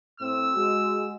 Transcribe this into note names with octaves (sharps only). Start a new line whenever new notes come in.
A2 C4 E6
G#3 F#4